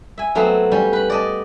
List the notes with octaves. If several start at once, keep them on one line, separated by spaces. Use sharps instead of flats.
E5 G#5
F#3 A3 B3 C4 F5
G3 C#4
B4 B5
D5 D#5 A5